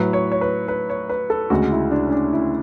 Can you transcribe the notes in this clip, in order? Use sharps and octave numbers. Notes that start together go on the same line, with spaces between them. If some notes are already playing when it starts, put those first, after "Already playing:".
Already playing: A2 F#3 B4
C#5
C#5
B4
B4
C#5
B4
A4
D2 C#3 G#3 F#4
E4
D4
C#4
D4
E4